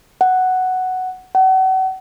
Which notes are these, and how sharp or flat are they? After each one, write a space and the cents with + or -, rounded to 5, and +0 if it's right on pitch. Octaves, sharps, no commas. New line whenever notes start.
F#5 +5
F#5 +35